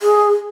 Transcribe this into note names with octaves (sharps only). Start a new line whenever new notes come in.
G#4